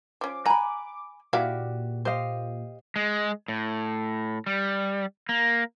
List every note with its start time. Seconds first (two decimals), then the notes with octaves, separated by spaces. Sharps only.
0.21 F3 C#4 D6
0.46 F#5 G#5 A#5 B5
1.33 A#2 E4 F#4 G4 D5 E5 F5
2.05 G4 C5 D#5 F5
2.96 G#3
3.48 A2
4.46 G3
5.29 A#3